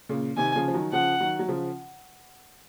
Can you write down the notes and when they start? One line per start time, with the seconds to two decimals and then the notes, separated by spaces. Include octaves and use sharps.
0.09 A#2 C#3
0.37 C3 D#3 G#5
0.55 C#3 F3
0.68 F3
0.74 D#3 F#3
0.93 C#3 F3 F#5
1.20 D#3 F#3
1.39 F#3
1.48 C#3 F3